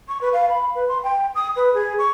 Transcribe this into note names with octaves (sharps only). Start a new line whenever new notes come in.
C#6
B4
F5
B5
B4
C6
G5
D#6
B4
G#4
C#6